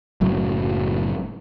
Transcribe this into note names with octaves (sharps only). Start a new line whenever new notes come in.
F#1 F#2 A2 F#3